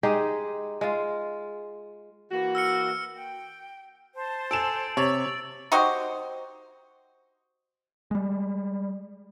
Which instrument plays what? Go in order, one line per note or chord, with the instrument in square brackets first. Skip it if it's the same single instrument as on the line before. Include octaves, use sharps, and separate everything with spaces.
[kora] G#3 D#4 G4 G#4
G#3 F4
[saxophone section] E3 A#3 F#4
[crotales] E6 F6 C#7
[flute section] G5
C5 A5
[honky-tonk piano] A4 G#5 E7 [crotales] E6 D7
[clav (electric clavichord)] C3 [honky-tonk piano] C#5 [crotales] A6 F#7
[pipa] D#4 F#4 G4 C5
[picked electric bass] G3 G#3